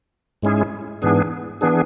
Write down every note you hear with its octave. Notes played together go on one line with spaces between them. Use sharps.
G#2 G#3 C#4 E4 G#4
G#2 E3 B3 D4 G#4
E3 B3 D4 G#4